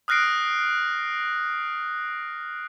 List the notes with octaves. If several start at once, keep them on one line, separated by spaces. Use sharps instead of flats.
D#6 F6 F#6 A#6 C7 D7